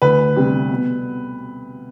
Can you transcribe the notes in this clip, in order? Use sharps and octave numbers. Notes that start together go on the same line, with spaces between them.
D2 B4
C3 G3 C4
B2